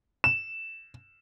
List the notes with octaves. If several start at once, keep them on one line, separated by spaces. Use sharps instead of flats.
E7